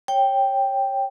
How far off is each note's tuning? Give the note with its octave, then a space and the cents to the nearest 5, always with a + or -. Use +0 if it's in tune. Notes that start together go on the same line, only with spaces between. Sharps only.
C#5 -15 G5 +0